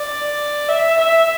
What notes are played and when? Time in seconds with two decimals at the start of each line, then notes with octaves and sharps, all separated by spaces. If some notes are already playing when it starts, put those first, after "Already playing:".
Already playing: D5
0.69 E5
0.99 E5